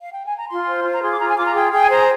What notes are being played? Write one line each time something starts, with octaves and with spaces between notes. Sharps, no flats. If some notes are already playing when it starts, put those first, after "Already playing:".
F5
G5
G#5
A#5
F4 C6
C5
F4
A#5
G#4 C6
D6
F4 A#5
G#5
F4 D6
A#5
G#4 G5
G#4 G5
G#5
C5 A#5